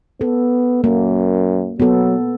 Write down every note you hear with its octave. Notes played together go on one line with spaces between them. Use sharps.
B3 A4
F#2 A#3
F#3 B3 A4